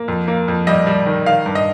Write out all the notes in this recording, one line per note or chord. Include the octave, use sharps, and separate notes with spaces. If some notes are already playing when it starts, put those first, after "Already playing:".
Already playing: A#3
F2
A#3
F2
G3 D#5
G3
D#3
D#3 F5
G2
D#5